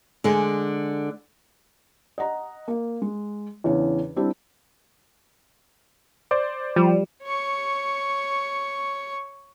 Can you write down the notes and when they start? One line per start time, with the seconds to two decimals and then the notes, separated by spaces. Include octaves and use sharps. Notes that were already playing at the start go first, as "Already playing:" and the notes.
0.24 D3 G#3
2.18 D#5 F#5 A#5
2.68 A#3
3.02 G#3
3.64 E2 C#3 E3 C#4 D4
4.16 G3 C4 D4 E4 G4
6.31 C5 D5 D6
6.76 F3 G3
7.23 C#5 C#6